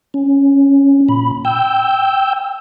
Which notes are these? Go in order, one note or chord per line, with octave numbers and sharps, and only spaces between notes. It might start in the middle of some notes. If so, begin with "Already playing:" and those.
C#4
A#2 B5
G5 E6 G6